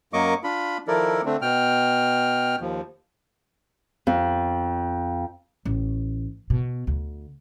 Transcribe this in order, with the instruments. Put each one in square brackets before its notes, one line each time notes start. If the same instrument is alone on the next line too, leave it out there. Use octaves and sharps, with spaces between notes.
[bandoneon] F#2 F#3 A#3 D#5 C#6 D6
D4 F4 B5
D#3 F3 E4 A4 A#4 D5
D3 A3 C4 D4
B2 G5 F6
D#2 F3
[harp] F2
[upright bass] A1
B2
D2